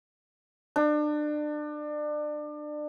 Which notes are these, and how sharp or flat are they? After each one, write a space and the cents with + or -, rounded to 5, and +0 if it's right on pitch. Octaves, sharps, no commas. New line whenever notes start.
D4 +30